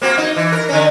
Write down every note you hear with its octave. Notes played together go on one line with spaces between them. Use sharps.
A#3 C4 F#4
D#4
E3
A#4
D3 C#4